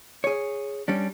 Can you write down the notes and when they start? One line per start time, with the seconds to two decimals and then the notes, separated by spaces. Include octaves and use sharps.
0.24 G#4 C#5
0.88 G3 C#4 D4